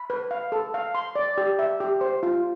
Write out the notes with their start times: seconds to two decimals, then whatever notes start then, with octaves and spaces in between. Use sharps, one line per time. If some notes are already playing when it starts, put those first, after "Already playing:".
Already playing: B5
0.10 B4
0.31 F5
0.52 A4
0.74 F5
0.95 C6
1.16 D5
1.38 G4
1.59 E5
1.80 G4
2.01 C5
2.23 F4